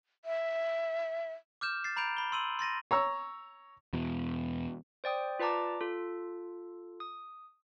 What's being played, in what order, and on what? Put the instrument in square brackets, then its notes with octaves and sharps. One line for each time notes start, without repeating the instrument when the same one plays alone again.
[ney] E5
[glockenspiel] D6 F6 G6 E7
A6 C7
A#5 B5 G6 D7 F7
B5 G7
C6 E6 D#7 F#7
C6 A6 A#6 D#7
[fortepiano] C#5 A#5 E6
[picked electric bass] E2 B2
[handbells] C5 D5 G5 D#6
F4 B4 D5 A5 A#5 D6
F4 A4
D#6